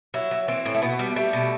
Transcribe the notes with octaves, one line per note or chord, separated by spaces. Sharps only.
F#3 E4
F#3
E3 C4
A2
A3
B2 B3
G3
G3 A3
B2